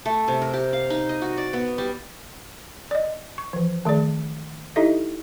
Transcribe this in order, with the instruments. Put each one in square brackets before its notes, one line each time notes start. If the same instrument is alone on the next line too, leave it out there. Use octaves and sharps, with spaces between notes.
[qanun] A3
C3
A#4
G4
F5
D#4
D#5
F#4
D5
B3
G3
[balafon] D5 D#5
C#6
E3 F3
D#3 A3 G#4 D5
D#4 E4 G4 A4 D#5 E5